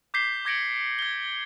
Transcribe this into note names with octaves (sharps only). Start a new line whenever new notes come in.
D6 G6 B6 C7 G7
D6 G#6 A#6 C#7 D7 F#7
G#6 G7